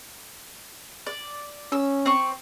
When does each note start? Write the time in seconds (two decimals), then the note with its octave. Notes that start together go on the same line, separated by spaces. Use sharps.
1.07 D5
1.72 C#4 E6
2.06 C4 C#6